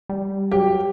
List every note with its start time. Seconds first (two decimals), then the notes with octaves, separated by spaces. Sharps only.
0.09 G3
0.52 F#3 G4